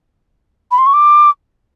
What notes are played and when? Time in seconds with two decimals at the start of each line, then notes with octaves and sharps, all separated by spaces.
0.71 B5
0.78 C6
0.86 C#6
0.93 D6